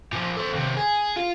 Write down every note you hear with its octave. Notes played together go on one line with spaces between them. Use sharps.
A#2 F3
A4 C5
D#2 C3
G#4
F4